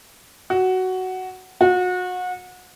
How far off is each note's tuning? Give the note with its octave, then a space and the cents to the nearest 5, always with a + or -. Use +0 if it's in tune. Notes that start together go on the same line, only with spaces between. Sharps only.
F#4 +10
F#4 -30